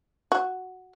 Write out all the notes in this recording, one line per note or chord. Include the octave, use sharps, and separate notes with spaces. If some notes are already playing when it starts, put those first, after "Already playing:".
F#4